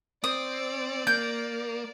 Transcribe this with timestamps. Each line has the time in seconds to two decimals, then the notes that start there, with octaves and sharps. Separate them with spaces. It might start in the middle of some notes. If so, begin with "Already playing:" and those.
0.24 C4 D5 D#6
1.07 A#3 G6